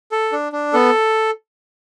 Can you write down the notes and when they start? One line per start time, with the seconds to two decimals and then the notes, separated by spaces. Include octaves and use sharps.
0.12 A4
0.32 D4
0.52 D4
0.73 B3 A4